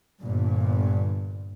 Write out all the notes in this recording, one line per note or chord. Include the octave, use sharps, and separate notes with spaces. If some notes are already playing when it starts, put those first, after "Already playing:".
G1 G2 A#2